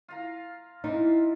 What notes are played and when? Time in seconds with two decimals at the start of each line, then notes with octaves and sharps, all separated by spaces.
0.08 F4 F5 A#5
0.84 E3 D#4 F4